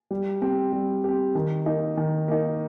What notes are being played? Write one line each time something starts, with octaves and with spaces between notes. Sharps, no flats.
G3
C4 G4
G3
C4 G4
D#3
A#3 D#4
D#3
A#3 D#4